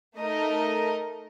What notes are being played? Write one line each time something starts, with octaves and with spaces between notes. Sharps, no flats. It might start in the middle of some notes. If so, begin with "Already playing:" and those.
A3 D#4 A#4 D#5